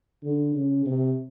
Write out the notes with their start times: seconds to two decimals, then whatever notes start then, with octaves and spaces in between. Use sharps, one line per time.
0.23 D3
0.55 C#3
0.86 C3